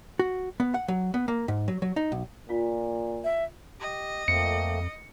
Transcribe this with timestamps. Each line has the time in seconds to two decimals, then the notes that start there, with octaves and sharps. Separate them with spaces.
0.19 F#4
0.60 B3
0.74 F#5
0.88 F#3
1.14 B3
1.28 A#3
1.48 G#2
1.68 F#3
1.82 F#3
1.96 D#4
2.12 B1
2.49 A#2 F4 F5
3.24 E5
3.80 G4 D#5
4.28 F2 A3 A#3 C4 C#7